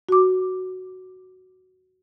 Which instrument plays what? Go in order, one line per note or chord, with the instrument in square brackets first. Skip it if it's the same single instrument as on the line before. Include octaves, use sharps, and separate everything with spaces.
[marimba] F#4 D6